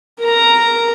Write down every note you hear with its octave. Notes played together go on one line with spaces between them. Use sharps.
A#4 A#5